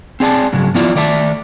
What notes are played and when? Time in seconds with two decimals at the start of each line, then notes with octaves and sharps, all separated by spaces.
0.20 C4 G#4 D5 A5
0.53 G#2 C#3 F#3 G#3
0.74 F3 B3 E4 F4 D5 E5
0.95 D#3 A3 D5 E5 A5